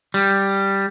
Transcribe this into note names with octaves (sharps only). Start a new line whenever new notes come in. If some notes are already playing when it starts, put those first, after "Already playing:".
G3